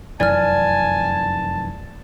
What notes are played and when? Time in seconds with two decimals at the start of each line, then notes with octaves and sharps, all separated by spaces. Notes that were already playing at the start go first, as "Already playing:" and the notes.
0.20 F1 F#2 E3 D5 G#5 A5 F6